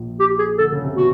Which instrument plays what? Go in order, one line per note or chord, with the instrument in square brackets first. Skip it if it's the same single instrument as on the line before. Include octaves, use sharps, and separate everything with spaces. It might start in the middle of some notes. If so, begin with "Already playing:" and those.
Already playing: [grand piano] A#1 A#2
[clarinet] G4
G#4
[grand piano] D3 [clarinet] A4
[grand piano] C#3
C3
[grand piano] B2 [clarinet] F#4